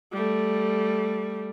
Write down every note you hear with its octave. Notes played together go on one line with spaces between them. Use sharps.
G3 A3